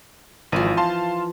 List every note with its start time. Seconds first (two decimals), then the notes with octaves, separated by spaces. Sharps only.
0.52 G#1 E3 F3 D#7
0.77 F5 A5 C6